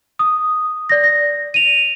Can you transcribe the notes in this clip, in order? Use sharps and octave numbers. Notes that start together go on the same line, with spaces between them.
D#6
D5 A#6
A#6
D#7 F7